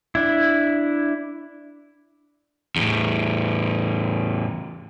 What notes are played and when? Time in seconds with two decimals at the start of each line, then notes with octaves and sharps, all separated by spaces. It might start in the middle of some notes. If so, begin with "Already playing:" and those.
0.15 D4 E4
2.76 E2 A2